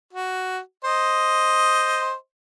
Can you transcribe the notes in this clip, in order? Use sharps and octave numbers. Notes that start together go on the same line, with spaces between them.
F#4
C5 D#5